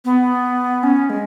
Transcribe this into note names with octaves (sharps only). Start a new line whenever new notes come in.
B3
C#4
G#3